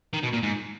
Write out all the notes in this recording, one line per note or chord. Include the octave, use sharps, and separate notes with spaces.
D#3
B2
A#2
G#2